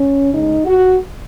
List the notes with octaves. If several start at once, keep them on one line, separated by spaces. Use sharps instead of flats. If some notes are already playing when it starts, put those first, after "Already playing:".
Already playing: C#4
C#3 G#3 D#4
F#4